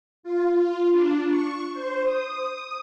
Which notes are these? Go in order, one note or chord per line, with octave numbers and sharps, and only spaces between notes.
F4
F4
D4
C#6
C5
D#6